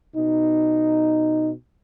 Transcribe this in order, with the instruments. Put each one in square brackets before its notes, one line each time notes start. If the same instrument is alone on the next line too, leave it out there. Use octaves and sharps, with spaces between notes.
[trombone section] B2 D#4